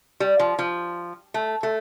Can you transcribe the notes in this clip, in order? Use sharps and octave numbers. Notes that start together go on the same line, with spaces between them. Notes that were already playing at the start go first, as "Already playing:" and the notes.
G3
F3
F3
A3
A3